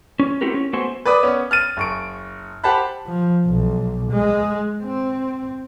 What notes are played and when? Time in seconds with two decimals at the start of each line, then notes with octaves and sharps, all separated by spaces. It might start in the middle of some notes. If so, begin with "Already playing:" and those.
0.19 C#4
0.41 A3 C4 E4 F#4 G4 A#4
0.54 C#4
0.73 A3 B3 F#4 A4 C5 G#5
1.05 B4 D5 B5 D6 D#6
1.23 B3 C#4
1.51 F6 A6 D#7
1.77 F#1 C#6 D7
2.64 G4 C5 F#5 A5 B5 F#6
3.07 F3
3.47 B1
4.11 G#3
4.83 C4